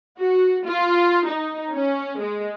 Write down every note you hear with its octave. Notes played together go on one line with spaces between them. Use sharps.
F#4
F4
D#4
C#4
G#3